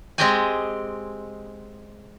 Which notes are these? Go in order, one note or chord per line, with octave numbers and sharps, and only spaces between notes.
G#3 C4 G4 D#5 G5 G#5